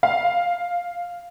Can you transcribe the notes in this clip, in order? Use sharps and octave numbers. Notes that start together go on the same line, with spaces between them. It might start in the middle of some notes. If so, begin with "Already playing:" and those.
F5